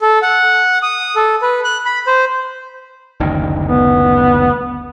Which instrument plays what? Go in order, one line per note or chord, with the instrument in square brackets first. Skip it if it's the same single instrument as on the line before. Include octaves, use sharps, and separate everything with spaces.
[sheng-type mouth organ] A4
F#5
D#6
A4
B4
F#6
B5
C5
[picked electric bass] F#1 D2 D#3
[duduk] B3